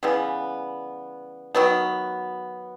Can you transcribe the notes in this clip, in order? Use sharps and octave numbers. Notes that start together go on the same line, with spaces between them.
C#3 E3 G3 B3
D#3 F#3 B3